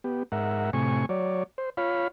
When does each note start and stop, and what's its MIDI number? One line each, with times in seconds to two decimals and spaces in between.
0.04 0.23 59
0.04 0.23 67
0.32 0.70 44
0.32 0.70 70
0.32 0.70 76
0.32 0.70 78
0.73 1.06 45
0.73 1.06 48
0.73 1.06 80
0.73 1.06 85
1.09 1.43 54
1.09 1.43 73
1.09 1.43 74
1.58 1.70 72
1.77 2.08 65
1.77 2.08 73
1.77 2.08 77
1.77 2.08 83